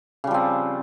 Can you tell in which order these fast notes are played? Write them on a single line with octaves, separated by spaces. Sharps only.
C#3 G3 F3 C4